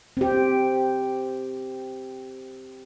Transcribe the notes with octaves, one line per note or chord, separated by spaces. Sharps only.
C4 G4